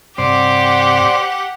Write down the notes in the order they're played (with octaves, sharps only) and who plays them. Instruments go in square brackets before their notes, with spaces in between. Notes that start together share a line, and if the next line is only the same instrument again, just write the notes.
[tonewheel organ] G2 C3 [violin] G4 F#5 [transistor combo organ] C5 D5